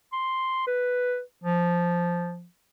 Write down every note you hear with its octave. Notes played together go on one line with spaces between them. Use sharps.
C6
B4
F3